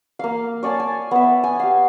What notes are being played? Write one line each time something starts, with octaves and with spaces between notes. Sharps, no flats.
A#3 F5
C#5 D5 G#5 A5
G#5
B3 E5
G#5
G4 F5